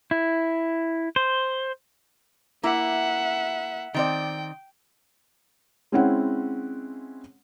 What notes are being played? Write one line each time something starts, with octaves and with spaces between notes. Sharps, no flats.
E4
C5
A#3 E4 E5 F#5
D#3 C4 D5 G5
G#3 C4 C#4 E4 F#5